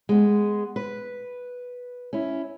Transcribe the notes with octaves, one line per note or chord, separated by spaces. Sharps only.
G#3 B3
B4
C#4 E4